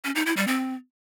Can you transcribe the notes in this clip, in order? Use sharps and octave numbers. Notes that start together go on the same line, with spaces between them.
C#4
D#4
E4
G3
C4